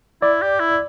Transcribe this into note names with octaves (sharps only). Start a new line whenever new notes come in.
E4 D5
G4
E4